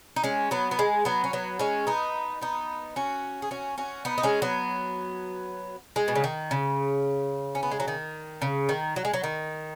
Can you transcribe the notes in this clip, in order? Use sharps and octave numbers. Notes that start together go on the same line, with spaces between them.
D#4
G#3 C#4
F#3 B3
B3
G#3
F#3 B3
C#4
F#3 B3
G#3 C#4
B3 D#4
B3 D#4
C#4 F#4
G#4
C#4 F#4
C#4 F#4
B3 D#4
D#4
G#3 C#4
F#3 B3
G#3
B2
C#3
D#3
C#3
C#4
B3
G#3
F#3
D#3
C#3
D#3
F#3
G#3
F#3
D#3